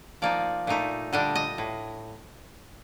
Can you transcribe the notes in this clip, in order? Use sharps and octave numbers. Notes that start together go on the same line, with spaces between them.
F3 A#3 D#4 D5
A#2 A3 D#4
D3 G3 D4 D#5
D#5
A2